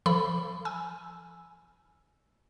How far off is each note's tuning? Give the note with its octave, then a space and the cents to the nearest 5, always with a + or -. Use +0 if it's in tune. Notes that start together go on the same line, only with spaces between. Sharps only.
F3 -30 A4 +5 B5 +0
G#5 +5 E6 +0